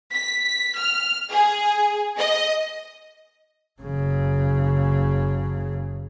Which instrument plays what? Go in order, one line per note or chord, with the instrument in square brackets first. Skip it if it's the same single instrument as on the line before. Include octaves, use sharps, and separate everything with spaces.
[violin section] B6
F6
G#4
D#5
[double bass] F#1 C#3